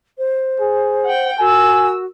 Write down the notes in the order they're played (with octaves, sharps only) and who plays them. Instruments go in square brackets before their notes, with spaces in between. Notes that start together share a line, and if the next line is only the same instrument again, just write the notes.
[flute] C5
[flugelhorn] G#4
[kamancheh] F#5 G5
[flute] F#4 [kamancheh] A#4 E6 [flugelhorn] G#5